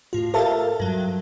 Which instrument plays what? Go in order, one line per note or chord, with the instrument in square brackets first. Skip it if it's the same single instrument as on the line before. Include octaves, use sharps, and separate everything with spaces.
[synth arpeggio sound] A2 F4
G4 A4 A#4 E5 F5 A5
G2 F#3